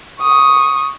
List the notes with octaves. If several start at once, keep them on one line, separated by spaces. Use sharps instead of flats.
C#6 D#6